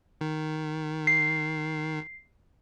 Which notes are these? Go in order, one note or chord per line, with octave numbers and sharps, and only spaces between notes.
D#3
C7